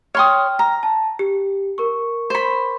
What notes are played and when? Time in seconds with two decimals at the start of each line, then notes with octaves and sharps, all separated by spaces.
0.15 C#5 G5 C6 D#6 F6
0.59 A#5
0.83 A5
1.19 G4
1.78 A#4 C#6
2.30 C5 B5